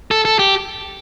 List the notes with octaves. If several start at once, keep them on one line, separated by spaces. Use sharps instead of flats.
A4
A4
G4